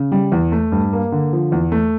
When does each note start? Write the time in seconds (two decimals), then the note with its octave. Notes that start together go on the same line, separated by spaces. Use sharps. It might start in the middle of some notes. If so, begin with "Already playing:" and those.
Already playing: C#3
0.12 G3
0.32 E2
0.52 A3
0.72 G2
0.93 A#3
1.12 D3
1.33 F3
1.52 E2
1.72 A3